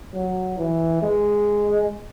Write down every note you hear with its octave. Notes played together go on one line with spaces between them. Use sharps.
F#3
E3
G#3